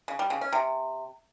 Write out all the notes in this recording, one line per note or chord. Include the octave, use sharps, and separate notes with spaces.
C#3
G3
C#3
C#4
C3